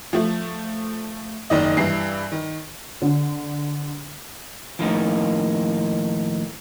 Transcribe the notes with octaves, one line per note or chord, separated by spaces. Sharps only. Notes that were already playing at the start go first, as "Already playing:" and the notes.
F3 A3
F#1 D#3 D5 D#5
G2 E3 C7
D#3
D3
D#2 A2 F3 A#3 D4 D#4